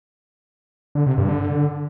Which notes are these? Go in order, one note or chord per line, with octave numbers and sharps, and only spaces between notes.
D3
C3
G2
D3